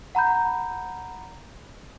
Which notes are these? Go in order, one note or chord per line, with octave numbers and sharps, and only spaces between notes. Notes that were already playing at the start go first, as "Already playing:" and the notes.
F#5 A#5 B5 G6